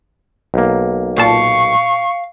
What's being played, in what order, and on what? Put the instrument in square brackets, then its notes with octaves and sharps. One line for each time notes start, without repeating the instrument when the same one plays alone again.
[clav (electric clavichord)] B1 A#3
[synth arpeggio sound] A#2 A5 [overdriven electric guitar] F5 [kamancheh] C#6